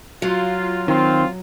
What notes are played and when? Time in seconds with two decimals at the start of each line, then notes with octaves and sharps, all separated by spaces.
0.22 F#3 F4
0.88 D#3 C4 F4